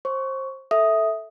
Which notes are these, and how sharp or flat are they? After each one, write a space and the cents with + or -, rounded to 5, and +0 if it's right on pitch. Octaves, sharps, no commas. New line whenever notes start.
C5 +25 C#6 +15
A4 +0 E5 -10 D#6 +5